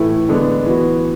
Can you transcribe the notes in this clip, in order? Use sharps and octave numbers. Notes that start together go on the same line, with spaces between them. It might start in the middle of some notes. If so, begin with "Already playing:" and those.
Already playing: A2 E3 A3 E4
D3 G#3 B3 D4
E3 B3 F#4